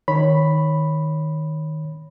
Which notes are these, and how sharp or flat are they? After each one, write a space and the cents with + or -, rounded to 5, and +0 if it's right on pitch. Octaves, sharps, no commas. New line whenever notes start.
D#3 +0 C#5 +0 B5 +0